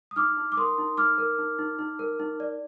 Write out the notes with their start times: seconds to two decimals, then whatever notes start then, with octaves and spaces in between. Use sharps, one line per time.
0.11 D#6
0.16 D#4 D6 F6
0.37 D#4
0.52 D6
0.57 A#4 C6 D#6
0.78 D#4
0.97 D#4 D6 F6
1.18 A#4
1.38 D#4
1.59 D#4
1.79 D#4
1.99 A#4
2.19 D#4
2.40 D5